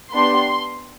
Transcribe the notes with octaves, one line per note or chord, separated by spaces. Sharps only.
B3 D4 G4 C6